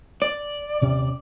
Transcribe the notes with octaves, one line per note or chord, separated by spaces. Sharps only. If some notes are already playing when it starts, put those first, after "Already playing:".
D5
D#1 C3 C#4